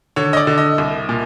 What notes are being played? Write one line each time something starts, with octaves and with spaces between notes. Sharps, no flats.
D3 C#5
D#5
D5
D3
D#5
C2
A#2